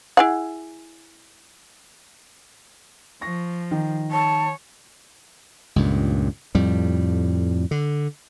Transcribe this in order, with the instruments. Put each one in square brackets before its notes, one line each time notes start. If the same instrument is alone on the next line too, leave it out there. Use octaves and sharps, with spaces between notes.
[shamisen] E4 G#4 F#5
[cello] F3 [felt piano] C#6 A#6
[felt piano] D#3
[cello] C#5 [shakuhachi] A5
[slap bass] C#2 G2 A#2
F2 A2 G3
D3